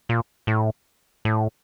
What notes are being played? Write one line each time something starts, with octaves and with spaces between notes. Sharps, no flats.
A#2
A2
A2